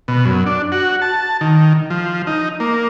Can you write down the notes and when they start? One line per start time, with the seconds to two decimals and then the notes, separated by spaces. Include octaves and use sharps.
0.08 B2
0.25 F#2
0.46 D4
0.72 F#4
1.02 A5
1.41 D#3
1.90 F3
2.27 D#4
2.60 A#3